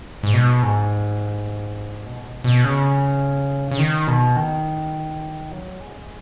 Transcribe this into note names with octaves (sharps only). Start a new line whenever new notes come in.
G#2
B2
G#2
B2
G#2
B2
B2
C#3
C#3
D#3
B2
D#3
F#3
G#3